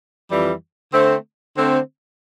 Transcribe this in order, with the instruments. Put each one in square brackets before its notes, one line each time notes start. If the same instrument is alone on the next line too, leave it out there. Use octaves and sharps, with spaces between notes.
[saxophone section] F2 E3 G3
D3 A3 C4
D3 A3 C4